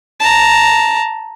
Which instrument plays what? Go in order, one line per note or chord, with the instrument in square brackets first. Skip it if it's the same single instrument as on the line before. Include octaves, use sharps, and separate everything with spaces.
[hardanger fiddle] A5 A#5